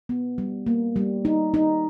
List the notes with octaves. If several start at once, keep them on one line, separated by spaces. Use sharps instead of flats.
B3
G3
A#3
G3
D#4
D#4